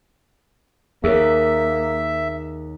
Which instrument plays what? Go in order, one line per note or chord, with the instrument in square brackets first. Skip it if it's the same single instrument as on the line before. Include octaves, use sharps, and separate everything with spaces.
[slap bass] D#2 [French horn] A#3 [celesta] G#4 A#4 C#5 [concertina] E5